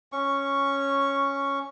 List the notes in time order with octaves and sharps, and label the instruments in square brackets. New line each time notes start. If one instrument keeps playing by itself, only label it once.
[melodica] C#4 C#6